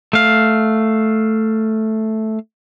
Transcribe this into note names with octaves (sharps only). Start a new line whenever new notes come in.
A3 F5